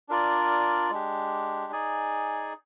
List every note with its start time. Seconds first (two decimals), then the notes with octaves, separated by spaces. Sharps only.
0.09 D4 F4 A#4 D5
0.90 G#3 D4 G4
1.72 D#4 G#4 D5 G#5